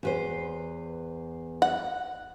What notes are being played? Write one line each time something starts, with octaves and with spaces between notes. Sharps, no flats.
E2 B4 C5
F#5